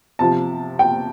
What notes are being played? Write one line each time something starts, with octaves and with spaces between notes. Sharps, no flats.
C3 F3 A5
G5